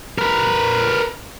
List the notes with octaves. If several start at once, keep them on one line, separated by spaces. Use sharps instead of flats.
A#4 B4